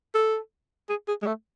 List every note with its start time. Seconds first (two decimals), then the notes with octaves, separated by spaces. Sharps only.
0.14 A4
0.89 G#4
1.08 G#4
1.22 G#3
1.27 A3